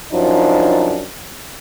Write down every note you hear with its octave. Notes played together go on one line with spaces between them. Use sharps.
F#2 F3 D4 D#4